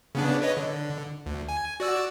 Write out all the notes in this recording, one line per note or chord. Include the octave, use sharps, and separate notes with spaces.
C#3 B3 D4
B4 C#5 D#5
D3
D2
G#5
F#4 D5 E6